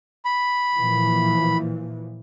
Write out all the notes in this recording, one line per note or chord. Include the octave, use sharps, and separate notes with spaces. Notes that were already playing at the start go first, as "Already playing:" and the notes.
B5
A#2 E3 F3